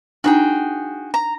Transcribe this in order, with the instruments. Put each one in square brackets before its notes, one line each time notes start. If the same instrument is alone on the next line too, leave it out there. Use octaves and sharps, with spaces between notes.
[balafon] D4 D#4 [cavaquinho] F#4 G#4 G5
[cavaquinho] A#5